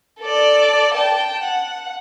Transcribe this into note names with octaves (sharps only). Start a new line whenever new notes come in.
A4 D5
G5 A5
F#5